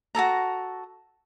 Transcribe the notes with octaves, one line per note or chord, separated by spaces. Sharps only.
F#4 G#4 A4 A#5